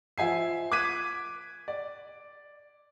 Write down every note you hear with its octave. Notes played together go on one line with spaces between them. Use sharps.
F3 E5 G#5 C7
D6 F#6 G#6 B6 D#7
D5